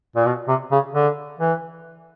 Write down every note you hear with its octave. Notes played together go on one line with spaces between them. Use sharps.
A#2
B2
C3
C#3
D3
E3